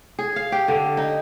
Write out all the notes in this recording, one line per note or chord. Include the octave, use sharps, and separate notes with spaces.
G#4
F5
G4
D3
D#4